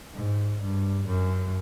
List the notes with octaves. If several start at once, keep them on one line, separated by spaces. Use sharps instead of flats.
G#2
G2
F#2